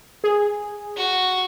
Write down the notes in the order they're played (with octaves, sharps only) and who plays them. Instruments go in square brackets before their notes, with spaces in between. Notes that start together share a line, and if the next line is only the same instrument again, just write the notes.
[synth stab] G#4
[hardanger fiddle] F#4